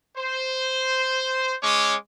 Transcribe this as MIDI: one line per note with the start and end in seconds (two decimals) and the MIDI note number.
0.18 1.55 72
1.63 1.96 56
1.63 1.96 61
1.63 1.96 73
1.63 1.96 86